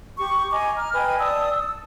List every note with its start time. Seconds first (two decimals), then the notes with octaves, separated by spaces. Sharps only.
0.18 G4 C#6
0.52 D#5 G#5 A#5 D6
0.77 A#5 F6
0.95 B4 D#5 G5 G#5
1.20 D5 A5 D#6 E6
1.51 E6